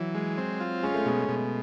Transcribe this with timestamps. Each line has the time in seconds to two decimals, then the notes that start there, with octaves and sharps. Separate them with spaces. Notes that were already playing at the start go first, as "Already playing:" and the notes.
Already playing: E3 F#3
0.15 G#3
0.38 C4
0.60 F4
0.83 G#3 C#4
0.94 A3
1.06 B2 G#3
1.29 B2